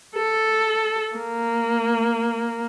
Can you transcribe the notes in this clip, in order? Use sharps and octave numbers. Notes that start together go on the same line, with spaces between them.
A4
A#3